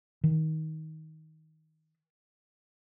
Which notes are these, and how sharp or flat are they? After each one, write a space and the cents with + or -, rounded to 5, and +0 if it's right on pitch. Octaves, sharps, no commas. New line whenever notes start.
D#3 +20